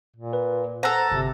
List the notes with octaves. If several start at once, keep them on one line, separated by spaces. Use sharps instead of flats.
A#2
B4
A4 C5 F#5 A#5 F#6
G1 C3